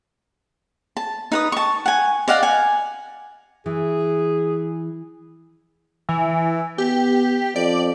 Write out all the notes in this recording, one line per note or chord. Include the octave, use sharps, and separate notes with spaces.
A5
D#4 B4 D#6
A5 C#6
F#5 G#5
D5 D#5 F5 F#5
F#5 G#5
E3 G#4
E3
B3 G4
F2 D5